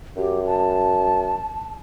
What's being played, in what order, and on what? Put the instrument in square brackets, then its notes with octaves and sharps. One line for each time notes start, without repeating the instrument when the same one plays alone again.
[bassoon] F#2 [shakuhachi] G4
[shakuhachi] A5